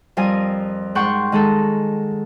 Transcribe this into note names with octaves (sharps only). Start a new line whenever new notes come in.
F2 G3 F4 A#4 G#5 D#6
G#2 F#5 G5 C6 C#6
D#3 G#3 G#4 A4